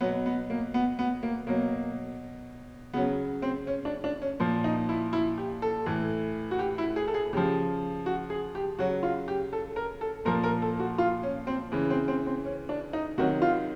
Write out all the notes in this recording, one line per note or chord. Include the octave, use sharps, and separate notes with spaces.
B2 F#3 B3
B3
A#3
B3
B3
A#3
B2 F#3 A#3
C#3 F#3 B3
C4
C#4
D4
D4
C#4
A#2 F3
D#4
E4
E4
G4
A4
A2 E3
F#4
G4
E4
G#4
A4
G#4
C#3 F3 G4
F#4
G#4
G4
C#3 F#3 F#4
F4
G4
A4
A#4
A4
A#2 F3 A#4
A#4
A4
F#4
F4
C#4
C4
C#3 E3
C4
C4
C4
C#4
D4
D#4
C3 D#3 F#3 F#4
F4